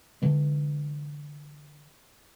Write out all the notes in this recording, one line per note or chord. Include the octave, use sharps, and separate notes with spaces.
D3 E3 G#3